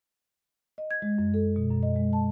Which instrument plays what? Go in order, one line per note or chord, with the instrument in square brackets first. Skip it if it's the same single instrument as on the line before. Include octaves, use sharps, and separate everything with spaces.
[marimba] D#5
G#6
G#3
F#2
A4
B2
F#2
D#5
G#3
A5